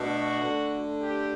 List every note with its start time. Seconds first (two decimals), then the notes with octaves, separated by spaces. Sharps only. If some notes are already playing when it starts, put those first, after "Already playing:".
Already playing: B2 A3 D4
0.12 F#4
0.41 D3 A3 D4
1.01 G4